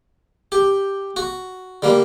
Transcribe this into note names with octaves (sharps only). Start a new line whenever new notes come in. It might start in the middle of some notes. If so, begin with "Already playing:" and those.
G4
F#4
D3 G3 A#3